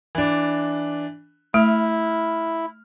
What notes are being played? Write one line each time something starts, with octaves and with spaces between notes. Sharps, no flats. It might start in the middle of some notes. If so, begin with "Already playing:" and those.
E3 D4
A3 E4 F6